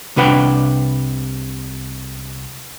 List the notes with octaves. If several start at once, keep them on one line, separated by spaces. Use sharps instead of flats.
C2 C3 D4 B4 F#5 G5